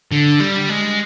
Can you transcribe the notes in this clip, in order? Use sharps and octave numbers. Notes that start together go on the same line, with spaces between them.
D3
G3
G#3